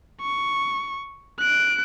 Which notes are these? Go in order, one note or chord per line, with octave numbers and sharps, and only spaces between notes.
C#6
F#6 D7